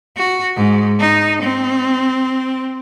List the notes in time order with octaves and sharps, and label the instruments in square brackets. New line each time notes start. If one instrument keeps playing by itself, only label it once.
[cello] F#4
G#2
D#4
C4